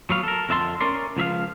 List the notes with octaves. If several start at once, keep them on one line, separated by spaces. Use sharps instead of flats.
F#3 B3 F5
A4 A#4
F2 D3 E5 A5 C6
C#4 A#4 D5 C6
C#2 F3 E5 F5